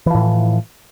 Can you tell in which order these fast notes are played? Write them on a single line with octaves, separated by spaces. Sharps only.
E3 F3 A2